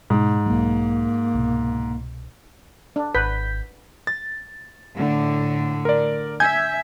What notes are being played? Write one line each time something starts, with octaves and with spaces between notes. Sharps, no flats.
G#2 B2
B1 F#3 A#3
C2 B2
D4
G#1 B4 G6 B6
A6
A2 D3
A#4 D5
E5 G#5 G6 G#6